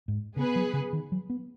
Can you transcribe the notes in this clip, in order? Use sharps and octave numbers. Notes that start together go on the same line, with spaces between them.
G#2
C#3 B3 G#4 B4
F#3
C#3
D#3
F#3
B3